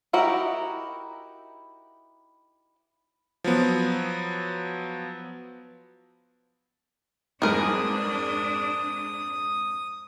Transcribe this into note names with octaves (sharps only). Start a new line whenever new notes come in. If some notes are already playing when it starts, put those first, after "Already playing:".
D#4 E4 F#4 G4 A#4
F3 F#3 B3
F2 G#2 D4 G#4 A#4 B4 D#6